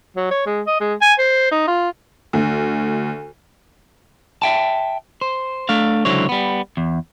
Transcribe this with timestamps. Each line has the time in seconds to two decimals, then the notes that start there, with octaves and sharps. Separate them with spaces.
0.17 F#3
0.31 C#5
0.46 G#3
0.67 D#5
0.80 G#3
1.02 G#5
1.19 C5
1.52 D#4
1.68 F4
2.33 D2
4.42 E5 G5 A5
5.21 C5
5.69 A3 D4 F5
6.05 C#2 D3 F#3 E4 C5 C#5
6.29 G3 B3
6.77 E2